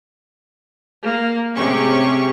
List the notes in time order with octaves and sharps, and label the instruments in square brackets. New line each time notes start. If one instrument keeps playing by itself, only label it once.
[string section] A#3
A2 C3 G#3 C#4 G4 C#6